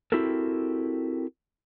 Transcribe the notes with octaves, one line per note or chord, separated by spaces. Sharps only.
C4 E4 F#4 G4 A4 A#4